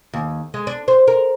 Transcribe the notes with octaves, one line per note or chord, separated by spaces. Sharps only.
D#2
G#3
D4
C5
A#4